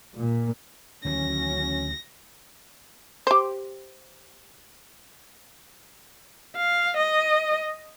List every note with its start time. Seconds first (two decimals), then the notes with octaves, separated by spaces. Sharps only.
0.16 A#2
1.05 D2 D#3 E3 F#3 C#4 A#6
3.27 G4 C5
6.57 F5
6.97 D#5